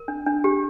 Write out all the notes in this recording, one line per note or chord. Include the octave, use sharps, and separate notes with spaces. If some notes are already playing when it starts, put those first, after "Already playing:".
Already playing: A#4
D4
D4
G4